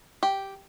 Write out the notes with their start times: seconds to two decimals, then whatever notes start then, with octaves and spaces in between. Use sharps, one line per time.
0.23 G4